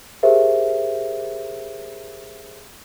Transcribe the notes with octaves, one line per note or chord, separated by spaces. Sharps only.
G4 G#4 A#4 C5 E5